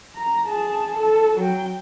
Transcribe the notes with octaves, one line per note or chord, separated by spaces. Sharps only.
A#5
G#4 A5
A4
F#3 G5